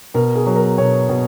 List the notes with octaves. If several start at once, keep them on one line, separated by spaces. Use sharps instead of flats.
B2 A#4
G#4
F#3
A#4
B2 C#5
B2